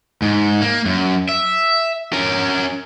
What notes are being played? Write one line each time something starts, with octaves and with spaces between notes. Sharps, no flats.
G#2
A#3
F#2
E5
C#4 A#4